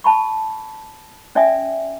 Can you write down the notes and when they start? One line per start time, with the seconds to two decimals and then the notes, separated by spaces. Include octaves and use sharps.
0.04 A5 B5 C#6
1.35 C#4 D5 E5 G#5 D#6